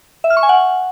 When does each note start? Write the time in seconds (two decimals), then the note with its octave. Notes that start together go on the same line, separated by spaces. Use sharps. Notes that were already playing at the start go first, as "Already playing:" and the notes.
0.24 E5
0.30 F6
0.37 C#6
0.43 G#5
0.49 F#5